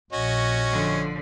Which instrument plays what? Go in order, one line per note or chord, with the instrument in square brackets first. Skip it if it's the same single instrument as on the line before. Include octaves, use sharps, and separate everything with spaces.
[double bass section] A#1 [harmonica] C#4 F#4 D#5
[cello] D3 F3